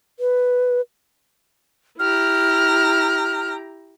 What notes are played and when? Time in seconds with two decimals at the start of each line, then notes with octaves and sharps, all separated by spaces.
0.20 B4
1.99 E4 G4 A#5 F6